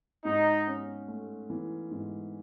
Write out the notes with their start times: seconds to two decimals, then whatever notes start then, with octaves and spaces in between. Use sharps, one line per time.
0.25 G#2 D#4
0.67 C#4
1.08 A3
1.50 E3
1.91 G#2